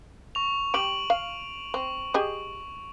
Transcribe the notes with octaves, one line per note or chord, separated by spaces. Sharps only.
C#6 F7
G3 G4 D7 F#7
F5
C4 C#6
G4 G#4 D#5